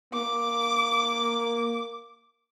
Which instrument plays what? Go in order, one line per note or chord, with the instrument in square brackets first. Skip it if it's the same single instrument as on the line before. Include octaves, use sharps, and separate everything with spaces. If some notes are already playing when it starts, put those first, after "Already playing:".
[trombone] A#3 [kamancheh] D6